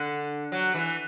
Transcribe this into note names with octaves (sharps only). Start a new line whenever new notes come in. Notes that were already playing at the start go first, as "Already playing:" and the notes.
Already playing: D3
F#3
E3